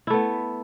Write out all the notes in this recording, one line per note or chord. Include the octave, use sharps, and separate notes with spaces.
A3 B3 E4